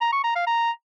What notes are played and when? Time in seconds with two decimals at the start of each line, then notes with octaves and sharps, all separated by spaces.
0.01 A#5
0.12 C#6
0.24 A#5
0.35 F5
0.47 A#5